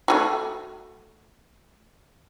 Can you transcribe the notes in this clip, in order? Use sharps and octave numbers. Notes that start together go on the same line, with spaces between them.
A3 F4 F#4